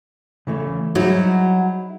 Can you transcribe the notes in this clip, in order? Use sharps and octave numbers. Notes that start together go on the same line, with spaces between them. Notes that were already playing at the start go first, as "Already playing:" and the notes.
C#3 E3 A3
F#3 D#4 E4 G#4